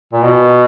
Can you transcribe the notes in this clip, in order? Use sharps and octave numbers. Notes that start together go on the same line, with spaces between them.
A#2
B2